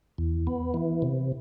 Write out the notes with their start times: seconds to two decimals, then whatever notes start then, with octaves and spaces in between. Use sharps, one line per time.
0.18 E2
0.47 B3
0.74 E3
1.02 C3